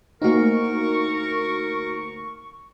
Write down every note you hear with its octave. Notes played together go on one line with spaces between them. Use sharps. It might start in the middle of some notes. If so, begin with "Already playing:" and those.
D2 A#3 D#4 F#4 A#4 C#6